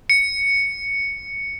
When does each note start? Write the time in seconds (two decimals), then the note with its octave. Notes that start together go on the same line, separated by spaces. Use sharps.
0.10 C#7